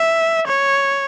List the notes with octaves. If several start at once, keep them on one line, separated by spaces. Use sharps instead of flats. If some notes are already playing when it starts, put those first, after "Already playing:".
Already playing: E5
C#5